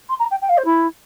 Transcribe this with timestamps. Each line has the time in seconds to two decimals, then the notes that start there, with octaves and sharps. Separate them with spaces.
0.09 C6
0.19 A#5
0.30 G5
0.41 G5
0.49 F5
0.57 C5
0.65 E4